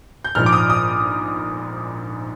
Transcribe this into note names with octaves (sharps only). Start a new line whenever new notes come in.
G6
A#1 G#2 F3 F6
D6
D#6
D#6